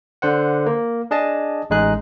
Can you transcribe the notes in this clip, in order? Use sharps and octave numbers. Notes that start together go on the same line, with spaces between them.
D3 C5 F#5
A#3
D4 G#4 D#5 A5
A1 G#3 D#4 G#4 F#6